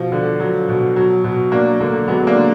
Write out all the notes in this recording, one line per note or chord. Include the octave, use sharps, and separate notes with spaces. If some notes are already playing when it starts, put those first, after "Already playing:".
Already playing: B2 F3
D3
F#3
B2
F#3
B2
F#3 A#3 D4
D3 A#3
F#3 G#3 B3
A#3 D4
D3